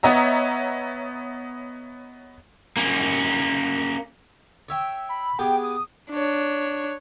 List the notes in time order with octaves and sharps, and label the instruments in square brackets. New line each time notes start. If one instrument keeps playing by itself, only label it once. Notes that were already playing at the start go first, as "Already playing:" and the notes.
[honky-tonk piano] B3 C#5 D#5 E5 A#5
[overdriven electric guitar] A#3 C#4
[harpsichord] C#5 E5 G5
[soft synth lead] B5
[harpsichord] B3 G4 G#4 [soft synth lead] G5
[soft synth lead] D#6
[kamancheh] D4 C#5